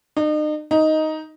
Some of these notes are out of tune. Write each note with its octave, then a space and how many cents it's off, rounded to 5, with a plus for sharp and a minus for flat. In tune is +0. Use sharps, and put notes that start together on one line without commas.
D#4 -40
D#4 +5